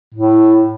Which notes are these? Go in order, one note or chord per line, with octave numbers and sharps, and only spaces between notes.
A2